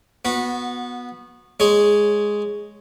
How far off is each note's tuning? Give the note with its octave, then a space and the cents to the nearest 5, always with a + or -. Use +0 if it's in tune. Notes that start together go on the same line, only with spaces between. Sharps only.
B3 -10 F#4 -25
G#3 +0 G#4 +0 C#5 +0